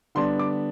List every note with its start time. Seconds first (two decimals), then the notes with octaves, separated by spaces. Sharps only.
0.15 D3 G3 B3 D4 C6
0.39 D6